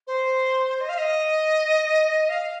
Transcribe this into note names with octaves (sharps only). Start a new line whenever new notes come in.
C5
D#5
F5
D#5
F5